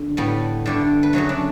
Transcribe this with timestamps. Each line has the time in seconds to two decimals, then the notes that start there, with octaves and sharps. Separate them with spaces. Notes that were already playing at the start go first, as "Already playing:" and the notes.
Already playing: D3
0.17 A2 G3 B3
0.66 G2 D3 A3 D5
1.03 B4
1.13 F#2 C#3 F#3 A3 C#5
1.29 D4